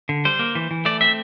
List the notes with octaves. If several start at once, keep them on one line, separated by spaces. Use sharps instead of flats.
D3
G3 C5
A#3
E3
E3
A3 D5
C4 E5